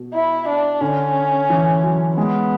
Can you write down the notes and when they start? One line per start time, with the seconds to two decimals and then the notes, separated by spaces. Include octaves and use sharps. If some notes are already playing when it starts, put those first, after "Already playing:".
Already playing: B2
0.14 E4
0.48 D4
0.81 D3 C#4
1.50 E3
1.83 F#3
2.17 G#3 B3